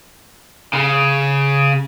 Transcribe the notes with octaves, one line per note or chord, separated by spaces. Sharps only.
C#3